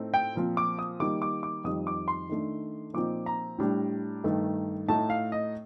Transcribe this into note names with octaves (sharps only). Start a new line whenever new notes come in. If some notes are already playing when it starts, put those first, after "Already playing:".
Already playing: A2 A3 C4 D#4
G5
A#2 F3 C4
D6
D#6
D#3 G3 A#3 D#4 D6
D6
D6
F2 D#3 G3 D#6
D6
C6
D#3 A3 D4
A#2 F3 C4 D#4 D6
A#5
A2 G3 D4
G2 D#3 A3
A2 A3 D#4 A5
F5
D#5